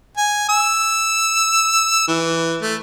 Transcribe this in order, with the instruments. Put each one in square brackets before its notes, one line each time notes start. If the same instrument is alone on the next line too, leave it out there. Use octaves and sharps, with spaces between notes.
[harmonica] G#5
E6
E3
A3